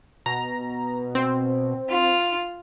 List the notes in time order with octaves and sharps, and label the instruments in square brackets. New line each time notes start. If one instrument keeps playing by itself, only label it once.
[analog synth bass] B2 [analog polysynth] A#5
[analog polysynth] C4
[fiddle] F4